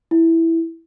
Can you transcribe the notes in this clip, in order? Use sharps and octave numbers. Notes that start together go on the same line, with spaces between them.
E4